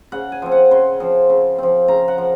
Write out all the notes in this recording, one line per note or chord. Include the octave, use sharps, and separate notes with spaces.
C#3 F#5
G#5
F3 C4
F#5
C#3 C6
F3 C4
C#3
F3 C4
C#3 A#5
F#5
F3